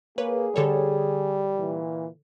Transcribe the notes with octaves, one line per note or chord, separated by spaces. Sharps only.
A#3 G#4 B4 C#5
D3 G3 A4 C#5
A#2 E3